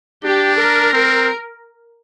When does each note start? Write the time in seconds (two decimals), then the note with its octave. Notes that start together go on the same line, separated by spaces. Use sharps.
0.24 D4 G4
0.58 A#4
0.93 C4